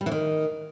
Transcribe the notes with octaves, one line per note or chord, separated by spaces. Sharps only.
G3
E3
D#3